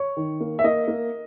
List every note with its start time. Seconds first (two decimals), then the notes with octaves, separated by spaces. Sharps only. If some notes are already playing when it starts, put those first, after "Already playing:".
Already playing: C#5
0.17 D#3
0.41 A#3
0.59 E5
0.64 A#3 D#5
0.88 A#3